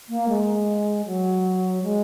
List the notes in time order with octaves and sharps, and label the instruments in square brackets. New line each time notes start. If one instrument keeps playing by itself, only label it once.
[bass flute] A#3
G#3
F#3
G#3